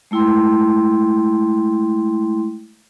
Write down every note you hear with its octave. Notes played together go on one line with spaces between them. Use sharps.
G#3 A3 E4 G5 C6